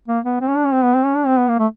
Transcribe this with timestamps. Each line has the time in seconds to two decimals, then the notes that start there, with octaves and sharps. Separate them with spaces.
0.08 A#3
0.25 B3
0.41 C4
0.49 C#4
0.57 D4
0.65 C#4
0.73 C4
0.84 B3
0.95 C4
1.05 C#4
1.16 D4
1.27 C4
1.38 B3
1.48 A#3
1.59 A3